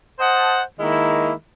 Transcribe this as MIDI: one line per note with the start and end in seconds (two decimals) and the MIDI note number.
0.19 0.60 72
0.19 0.60 75
0.19 0.60 78
0.19 0.60 81
0.80 1.32 51
0.80 1.32 56
0.80 1.32 58
0.80 1.32 64